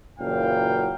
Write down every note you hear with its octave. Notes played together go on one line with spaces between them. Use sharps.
F#1 A#2 E3 F#3 F5 G5